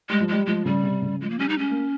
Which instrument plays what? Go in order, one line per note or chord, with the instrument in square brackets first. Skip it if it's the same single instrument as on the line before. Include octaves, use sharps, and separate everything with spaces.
[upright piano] G3 [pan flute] G#3
[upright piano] F3
[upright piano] G3 [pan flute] G#3
[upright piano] F3 [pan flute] G#3
[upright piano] C#3 [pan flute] G3
[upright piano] C3
C#3
[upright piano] F3 [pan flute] G#3
[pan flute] A#3
[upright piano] G3 [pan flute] C#4
[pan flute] D#4
[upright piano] G#3 [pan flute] C#4
[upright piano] A#3